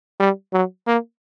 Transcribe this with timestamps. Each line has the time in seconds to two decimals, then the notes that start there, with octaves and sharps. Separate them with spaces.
0.20 G3
0.53 F#3
0.87 A#3